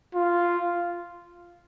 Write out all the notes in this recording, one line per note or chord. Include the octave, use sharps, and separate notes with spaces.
F4